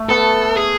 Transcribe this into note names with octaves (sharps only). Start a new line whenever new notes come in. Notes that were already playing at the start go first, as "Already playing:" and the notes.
Already playing: A3
B3 A4
G#4